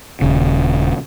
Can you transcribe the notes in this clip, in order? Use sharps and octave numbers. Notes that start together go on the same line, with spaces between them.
D#1 C#3